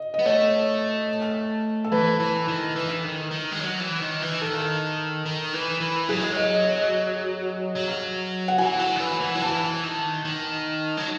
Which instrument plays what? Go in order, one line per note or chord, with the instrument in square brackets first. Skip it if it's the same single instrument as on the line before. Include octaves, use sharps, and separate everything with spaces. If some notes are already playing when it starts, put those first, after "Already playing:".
Already playing: [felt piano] D#5
D#5
[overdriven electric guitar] B3
[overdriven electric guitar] A3 [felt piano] C#5
[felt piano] A4
[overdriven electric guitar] E3 [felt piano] B4
[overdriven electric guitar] E3
D#3
E3
D#3
D#3
G#3
F#3
E3
D#3
E3
[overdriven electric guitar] D#3 [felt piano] A4
[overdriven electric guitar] D#3
E3
E3
[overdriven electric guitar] F#3 [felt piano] G#4
[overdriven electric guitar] G#3
[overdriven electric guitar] F#3 [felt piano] D#5
[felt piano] D#5
[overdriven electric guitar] F#3
[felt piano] F#5
[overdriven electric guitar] E3 [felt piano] G#5
[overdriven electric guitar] F#3
D#3
E3
E3
F#3
[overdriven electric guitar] E3 [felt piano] A5
[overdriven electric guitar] D#3
D#3
F#3